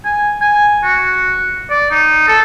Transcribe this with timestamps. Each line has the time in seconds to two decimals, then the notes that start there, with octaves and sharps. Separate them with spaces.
0.05 G#5
0.42 G#5
0.84 F#4
1.70 D5
1.91 D#4
2.28 A4